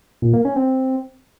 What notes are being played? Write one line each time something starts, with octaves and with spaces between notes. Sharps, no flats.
A#2
A#3
C#4
C4